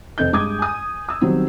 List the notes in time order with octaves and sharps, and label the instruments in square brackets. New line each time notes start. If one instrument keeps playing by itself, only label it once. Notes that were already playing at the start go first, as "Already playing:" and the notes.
[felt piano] F1 C4 A4 D#5 G6
G2 G#3 D6 D#6 G#6
G#5 D#6
D#6 E6
D#3 F#3 G3 B3 C4